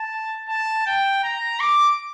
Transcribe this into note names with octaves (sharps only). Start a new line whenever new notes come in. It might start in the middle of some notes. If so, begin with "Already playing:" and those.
Already playing: A5
A5
G5
A#5
D6